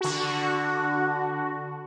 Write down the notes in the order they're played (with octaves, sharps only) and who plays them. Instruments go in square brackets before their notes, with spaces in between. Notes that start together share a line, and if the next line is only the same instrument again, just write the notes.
[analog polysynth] D3 F#4